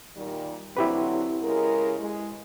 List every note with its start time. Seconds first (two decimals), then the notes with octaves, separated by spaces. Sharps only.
0.17 A#2 D#3 G3
0.77 D3 F#3 C4 E4 G4 B4
1.43 C#3 G#3 A#4
2.00 G#3